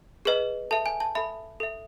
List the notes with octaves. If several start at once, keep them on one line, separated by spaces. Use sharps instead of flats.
G#4 B4 D#5
A4 E5 A5
G#5
A5
A4 E5 B5
A4 E5